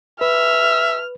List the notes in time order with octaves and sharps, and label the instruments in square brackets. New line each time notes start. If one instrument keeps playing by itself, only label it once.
[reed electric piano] B4 [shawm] E5 [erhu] F6